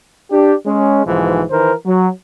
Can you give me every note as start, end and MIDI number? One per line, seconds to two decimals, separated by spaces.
0.32 0.53 62
0.32 0.53 67
0.66 1.03 56
0.66 1.03 61
1.05 1.43 35
1.05 1.43 44
1.05 1.43 52
1.05 1.43 53
1.51 1.72 51
1.51 1.72 52
1.51 1.72 70
1.51 1.72 72
1.85 2.08 54